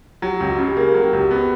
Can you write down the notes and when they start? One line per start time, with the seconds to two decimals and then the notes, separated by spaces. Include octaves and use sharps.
0.22 F#3 G4
0.40 C#2
0.50 F#4
0.58 C#3
0.68 G4
0.77 A#3 G#4
0.94 F#3
1.03 G4
1.13 C#2
1.31 B3